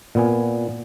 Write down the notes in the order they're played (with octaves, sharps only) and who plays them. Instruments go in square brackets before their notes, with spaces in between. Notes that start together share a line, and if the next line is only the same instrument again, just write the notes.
[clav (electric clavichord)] A#2 B3 G#5